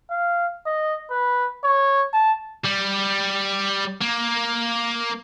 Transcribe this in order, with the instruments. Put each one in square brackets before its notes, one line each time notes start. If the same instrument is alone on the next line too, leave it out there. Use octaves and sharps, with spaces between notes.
[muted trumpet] F5
D#5
B4
C#5
A5
[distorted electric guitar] G3
A#3